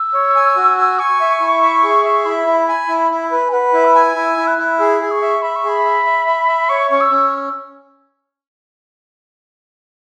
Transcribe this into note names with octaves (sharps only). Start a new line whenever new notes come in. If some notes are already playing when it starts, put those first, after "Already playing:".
Already playing: E6
C#5
G#5
F#4
G#5
G#5 C#6
E5
E4
E5
G#4
E5
E4 B5
E4
G#5
E4
E4
B4
G#5
B4 F#5
E4
E6
G#5
E4 E6
E4
F#6
E4
G#4 E6
G#4
C#6
E5
E5 B5
C#6
G#4 B5
E5
E5
E5
E5
C#5 C#6
C#4 C#6
E6
C#4